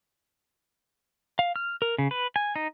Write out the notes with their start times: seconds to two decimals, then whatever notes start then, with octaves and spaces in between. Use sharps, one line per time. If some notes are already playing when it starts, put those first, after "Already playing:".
1.39 F5
1.56 F6
1.82 A#4
1.98 C#3
2.11 B4
2.36 G#5
2.56 D#4